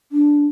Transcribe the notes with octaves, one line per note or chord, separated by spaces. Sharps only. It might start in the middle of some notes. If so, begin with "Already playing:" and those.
D4